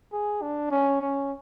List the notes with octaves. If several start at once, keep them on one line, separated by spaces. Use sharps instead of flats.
G#4
D4
C#4
C#4